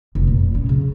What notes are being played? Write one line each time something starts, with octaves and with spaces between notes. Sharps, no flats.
F1
A#2
C#4
C#3